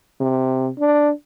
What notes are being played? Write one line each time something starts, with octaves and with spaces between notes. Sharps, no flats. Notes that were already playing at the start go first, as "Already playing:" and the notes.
C3
D4